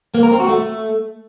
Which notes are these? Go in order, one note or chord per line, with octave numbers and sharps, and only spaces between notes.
A#3
A#4
C4
F#4
A3